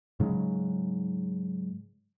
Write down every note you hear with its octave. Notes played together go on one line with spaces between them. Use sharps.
G#2 C#3 F#3 G#3